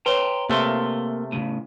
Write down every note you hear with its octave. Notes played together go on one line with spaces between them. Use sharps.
B4 C#5 G5 A#5 C6
C3 A3 A#3 A#4 C6
A2 C#3 D#7